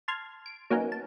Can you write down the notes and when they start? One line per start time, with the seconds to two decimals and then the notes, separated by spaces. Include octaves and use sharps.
0.08 A5 C6 F6 G#6
0.46 D7
0.70 F#3 A#3 B3 C#4 D#4
0.92 A5